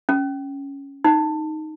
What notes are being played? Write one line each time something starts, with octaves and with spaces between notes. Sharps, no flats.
C#4
D#4